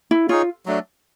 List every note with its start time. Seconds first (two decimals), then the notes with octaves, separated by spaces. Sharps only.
0.11 E4
0.29 D#4 F4 G#4 C#5
0.66 F#3 A3 D4